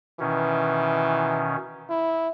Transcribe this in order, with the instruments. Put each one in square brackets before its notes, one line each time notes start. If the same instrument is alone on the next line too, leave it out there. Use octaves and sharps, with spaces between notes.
[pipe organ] B2 D#3 C#4 [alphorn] E3
[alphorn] E4